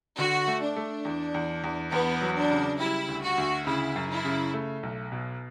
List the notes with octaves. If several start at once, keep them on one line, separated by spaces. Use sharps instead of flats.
D3 F#4
A3
D4
A3
E2
E2
E2
E2 B3
F#3
D4
C#3
G3 E4
D2
F#4
D2
C#3 E4
F#2
E4
C#3
A3
B1
B2